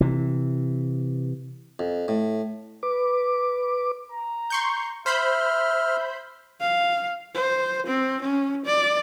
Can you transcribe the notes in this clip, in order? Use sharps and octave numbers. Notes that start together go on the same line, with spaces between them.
C3 E3
F2
A2
B4 D6
A#5
C6 C#6 G6
C5 E5 B5 F6 G6
F5
C5
C4
C#4
D5